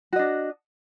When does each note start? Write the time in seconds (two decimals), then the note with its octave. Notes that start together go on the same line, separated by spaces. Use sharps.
0.13 F#4
0.16 D#5
0.19 D4